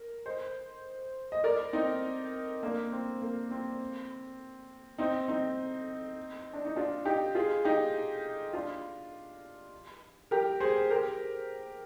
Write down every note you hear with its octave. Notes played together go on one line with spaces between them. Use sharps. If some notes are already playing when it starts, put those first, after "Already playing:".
Already playing: A#4
C5 D#5
D#5
A#4 D5
C4 D#4
A#3 D4
C4
A#3
C4
C4 D#4
C4 D#4
D4
D#4
D4 F4
D#4 G4
F4 G#4
D#4 G4
D4 F4
G4 A#4
G#4 C5
G4 A#4